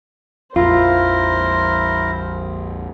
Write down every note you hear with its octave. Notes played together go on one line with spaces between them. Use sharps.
A#1 F2 E4 F4 A#4 C5